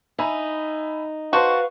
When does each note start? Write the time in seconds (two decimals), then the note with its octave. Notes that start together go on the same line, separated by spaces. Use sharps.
0.19 D#4 E5 G#5 B5
1.33 F#4 B4 C5 F5 A5 C6 C#6